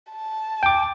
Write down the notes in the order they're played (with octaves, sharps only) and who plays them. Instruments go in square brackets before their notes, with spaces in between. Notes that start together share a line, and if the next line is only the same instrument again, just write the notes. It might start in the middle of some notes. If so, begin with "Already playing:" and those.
[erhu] A5
[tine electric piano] G5 D6